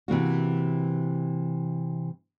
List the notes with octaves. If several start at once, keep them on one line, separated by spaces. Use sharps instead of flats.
C3 E3 A#3 F#4